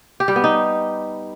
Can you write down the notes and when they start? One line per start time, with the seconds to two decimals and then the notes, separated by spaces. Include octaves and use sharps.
0.20 G4
0.28 G3
0.36 B3
0.44 D#4